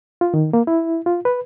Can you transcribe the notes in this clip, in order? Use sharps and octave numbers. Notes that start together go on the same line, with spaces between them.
F4
D#3
A#3
E4
F4
B4